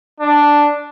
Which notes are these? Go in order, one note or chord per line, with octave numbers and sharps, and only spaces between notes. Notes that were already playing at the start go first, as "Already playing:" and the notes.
D4